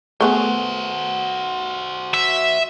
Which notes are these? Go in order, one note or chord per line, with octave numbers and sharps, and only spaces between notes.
A3 B3 F#4 G#4 C5
E5